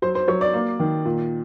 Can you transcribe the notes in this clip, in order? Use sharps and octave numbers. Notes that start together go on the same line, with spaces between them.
F#3 C5
C5
F#3 C#5
D5
A#3
D#3
A#2